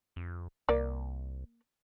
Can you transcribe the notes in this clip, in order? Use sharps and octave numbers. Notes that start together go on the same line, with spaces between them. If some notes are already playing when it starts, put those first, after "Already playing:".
F2
C2 A#3 D5